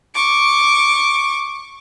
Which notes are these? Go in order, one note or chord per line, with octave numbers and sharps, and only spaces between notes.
C#6 D6